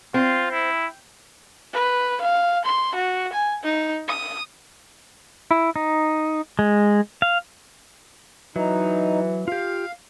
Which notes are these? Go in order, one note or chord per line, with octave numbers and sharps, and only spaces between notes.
C4 F4
E4
B4
F5
C6
F#4
G#5
D#4
D#6
E4
D#4
G#3
F5
E3 F#3 D#4
F4 G4 F5